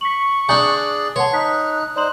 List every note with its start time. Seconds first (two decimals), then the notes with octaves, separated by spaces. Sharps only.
0.01 C#6 B6 F#7
0.49 D4 G#4 D5 F#5 G#5 A#5 G6
1.16 B4 C#5 F#5 A5 C6
1.33 D#4 A5 F#6 B6
1.76 F#6
1.96 D#4 C5 D5 C6 F#7